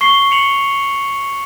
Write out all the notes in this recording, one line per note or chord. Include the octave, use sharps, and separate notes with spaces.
C#6 C7 G7
C#7 F7 F#7